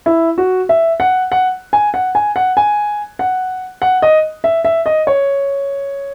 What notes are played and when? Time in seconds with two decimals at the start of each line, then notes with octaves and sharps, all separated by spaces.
0.06 E4
0.38 F#4
0.69 E5
1.00 F#5
1.32 F#5
1.73 G#5
1.94 F#5
2.15 G#5
2.36 F#5
2.57 G#5
3.19 F#5
3.82 F#5
4.02 D#5
4.44 E5
4.65 E5
4.86 D#5
5.07 C#5